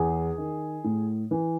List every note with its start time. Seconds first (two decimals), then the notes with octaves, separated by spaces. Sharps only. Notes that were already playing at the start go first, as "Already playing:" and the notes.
Already playing: E2 G#4
0.38 D#3
0.84 A2
1.31 E3